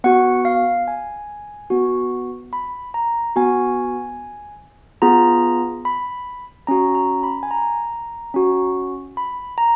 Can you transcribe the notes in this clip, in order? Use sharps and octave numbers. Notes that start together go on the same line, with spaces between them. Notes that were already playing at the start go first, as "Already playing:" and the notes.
B3 F#4 F#5
F5
G#5
B3 F#4
B5
A#5
B3 F#4 G#5
B3 F4 G#4 A#5
B5
C#4 F#4 A#5
A#5
B5
G#5
A#5
C#4 F#4
B5
A#5